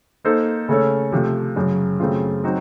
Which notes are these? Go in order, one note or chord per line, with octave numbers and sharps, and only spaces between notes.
A#3 D#4 A4 C5
C#3 A3 C#4 A4 C#5
C3 F3 A3
F#2 C#3 F#3
F#2 C#3 A3 C4 F4
F#3 C4 D#4 F#4